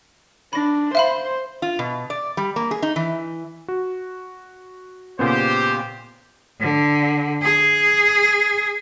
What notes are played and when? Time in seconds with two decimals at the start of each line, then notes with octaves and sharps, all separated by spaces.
0.53 D4 B5 A#6
0.95 C5 E5 F5 B5
1.62 F4
1.79 B2
2.10 D5
2.37 G3
2.56 A#3
2.71 G#4
2.82 D#4
2.96 E3
3.68 F#4
5.19 A#2 C#3 B3 G4 C5
6.61 D3
7.42 G#4